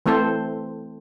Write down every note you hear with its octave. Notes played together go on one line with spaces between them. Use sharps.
E3 A3 C4 A4 C5